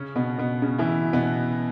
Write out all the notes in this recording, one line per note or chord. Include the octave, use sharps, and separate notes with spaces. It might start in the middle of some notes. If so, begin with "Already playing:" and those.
Already playing: C#3 C#4
B2 B3
B2 B3
C#3 C#4
E3 E4
B2 B3